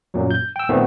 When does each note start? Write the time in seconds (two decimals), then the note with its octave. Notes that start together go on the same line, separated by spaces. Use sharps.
0.14 F#2 A#2 F#3
0.31 G6
0.56 G5 E6
0.69 A#2 D#3 A3 B3 C4